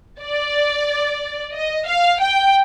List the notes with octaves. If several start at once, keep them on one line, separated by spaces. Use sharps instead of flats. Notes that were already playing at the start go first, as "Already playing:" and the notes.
D5
D#5
F5
G5